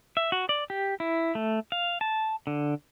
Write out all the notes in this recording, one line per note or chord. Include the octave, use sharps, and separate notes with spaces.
E5
F#4
D5
G4
E4
A3
F5
A5
D3